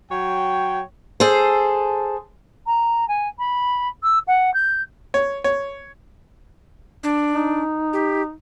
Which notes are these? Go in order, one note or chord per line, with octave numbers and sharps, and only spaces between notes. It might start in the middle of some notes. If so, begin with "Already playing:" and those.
F#3 C#5 G5
G#4 A4 C5
A#5
G#5
B5
E6
F#5
G6
C#5
C#5
D4
D#4
G4